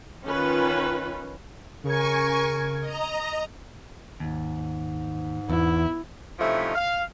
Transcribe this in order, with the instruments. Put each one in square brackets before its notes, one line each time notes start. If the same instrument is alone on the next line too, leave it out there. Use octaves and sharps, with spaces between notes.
[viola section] D#3 C#4 F4 B4
[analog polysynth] C#3 G#6 [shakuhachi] A#4 [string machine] G#5 C#6
[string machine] D#5 A#5
[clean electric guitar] D#2 [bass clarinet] G#2
[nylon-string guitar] E2 [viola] E4
[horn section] C3 F3 A3 C#4 D#4 E4
F5